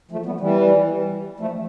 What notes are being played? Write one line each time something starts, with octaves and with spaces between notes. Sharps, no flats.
F3 A3
G3 B3
E3 G3
F3 A3